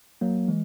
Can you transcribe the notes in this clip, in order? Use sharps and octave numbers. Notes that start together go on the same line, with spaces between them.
F#3 A#3
E3 G#3